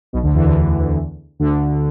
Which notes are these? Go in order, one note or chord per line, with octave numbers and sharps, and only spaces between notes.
B1 B2
D2 D3
E2 E3
D2 D3
D2 D3